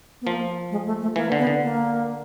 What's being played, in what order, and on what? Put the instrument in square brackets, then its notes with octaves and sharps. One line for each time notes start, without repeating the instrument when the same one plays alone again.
[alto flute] B3
[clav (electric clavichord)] F3 [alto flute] A#3
[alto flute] G#3
A3
A3
[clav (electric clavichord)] E3 [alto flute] A#3
[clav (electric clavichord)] D3
[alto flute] B3
[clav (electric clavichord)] D3
[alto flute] A#3